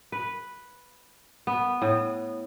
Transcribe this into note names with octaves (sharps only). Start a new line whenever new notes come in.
B4
B3
A2